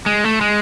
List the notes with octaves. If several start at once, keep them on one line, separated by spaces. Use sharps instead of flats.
G#3
A3
G#3